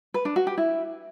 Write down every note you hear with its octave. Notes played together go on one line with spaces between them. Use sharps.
B4
D4
F#4
G4
E4